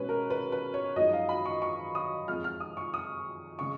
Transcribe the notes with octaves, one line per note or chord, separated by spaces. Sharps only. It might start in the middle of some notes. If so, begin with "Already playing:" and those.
Already playing: B2 G#3 C#4 B4
A#4
B4
B4
C#5
F#2 F3 G#3 D#4 D#5
F5
B5
C#6
C#6
D#6
F2 F3 G#3 F6
F6
D#6
C#6
D#6
C#3 G#3 C#6